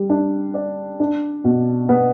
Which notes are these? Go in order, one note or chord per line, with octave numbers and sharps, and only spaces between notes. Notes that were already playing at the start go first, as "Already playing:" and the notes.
Already playing: G3
D4
D5
D4
B2
B3